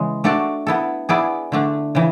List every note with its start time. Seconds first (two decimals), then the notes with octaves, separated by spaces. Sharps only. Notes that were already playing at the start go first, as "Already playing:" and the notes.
Already playing: C#3 E3 G#3
0.24 A3 D4 F#4 A4 D5
0.67 B3 E4 A4
1.09 B3 E4 G#4 D5
1.52 D3 A3 D4
1.95 C#3 E3